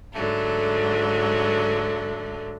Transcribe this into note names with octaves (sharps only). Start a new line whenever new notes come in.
G#2 D3 F#3 A3